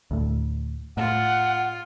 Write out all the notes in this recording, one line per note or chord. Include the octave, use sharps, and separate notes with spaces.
D2 A2
A2 F4 F#5